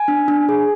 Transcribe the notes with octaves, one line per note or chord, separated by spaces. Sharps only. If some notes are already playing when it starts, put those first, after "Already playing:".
Already playing: G#5
D4
D4
G#4